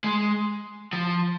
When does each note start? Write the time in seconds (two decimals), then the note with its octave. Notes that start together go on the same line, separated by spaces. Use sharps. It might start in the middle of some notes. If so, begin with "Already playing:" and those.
0.04 G#3
0.93 F3